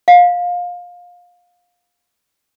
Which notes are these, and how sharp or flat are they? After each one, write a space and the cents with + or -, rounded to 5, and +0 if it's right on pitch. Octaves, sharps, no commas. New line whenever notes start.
F5 +20